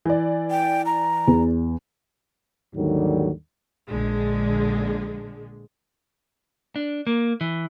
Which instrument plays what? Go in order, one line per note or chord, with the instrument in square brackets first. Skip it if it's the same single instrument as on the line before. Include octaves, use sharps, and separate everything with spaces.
[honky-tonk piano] E3 D5
[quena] G5
A#5
[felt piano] E2
[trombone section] D#2 G#2 D3 D#3 F#3 G3
[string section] A#1 D3 G#3
[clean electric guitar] D4
A#3
E3